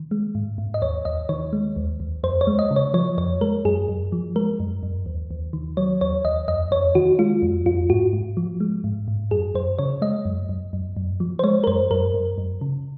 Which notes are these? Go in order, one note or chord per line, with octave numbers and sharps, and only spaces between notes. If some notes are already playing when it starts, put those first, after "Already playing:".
Already playing: D#3
G#3
G#2
G#2
D#5
D#2 C#5
D#2 D#5
D#3 C#5
G#3
D#2
D#2
F2 C5
C#5
G#3
D#5
C#3
C#5
F3 C#5
F2 C#5
G#3 A#4
F#2 G#4
F#2
F3
G#3 A#4
F#2
F#2
D#2
D#2
D#3
F#3 C#5
D#2 C#5
D#2 D#5
F2 D#5
F2 C#5
D#3 F#4
G#3 F4
F2
F2 F4
G#2 F#4
G#2
F3
G#3
G#2
G#2
F#2 G#4
F#2 C5
C#3 C#5
G#3 D#5
F#2
F#2
F#2
F#2
F3
C5
G#3 C#5
A#4
F#2 C5
F#2 A#4
F#2
F#2
C#3